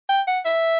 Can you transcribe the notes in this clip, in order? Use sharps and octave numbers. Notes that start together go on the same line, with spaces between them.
G5
F#5
E5